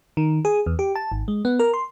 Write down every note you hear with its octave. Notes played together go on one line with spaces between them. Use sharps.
D#3
G#4
E2
G4
A5
G#1
G#3
B3
A#4
C6